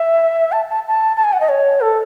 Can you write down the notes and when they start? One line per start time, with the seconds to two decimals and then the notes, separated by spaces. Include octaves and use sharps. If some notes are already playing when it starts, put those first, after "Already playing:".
Already playing: E5
0.52 A5
0.70 A5
0.88 A5
1.16 A5
1.24 G#5
1.33 F#5
1.40 D#5
1.49 C#5
1.81 A4